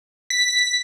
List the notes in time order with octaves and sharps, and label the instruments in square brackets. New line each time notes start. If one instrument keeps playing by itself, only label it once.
[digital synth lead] B6